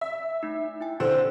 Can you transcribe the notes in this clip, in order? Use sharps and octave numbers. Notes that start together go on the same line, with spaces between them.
E5
A3 D#4
E4 G5 G#5
D3 C4 E4 C5 G#5